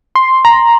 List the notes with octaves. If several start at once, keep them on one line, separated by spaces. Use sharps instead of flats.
C6
A#5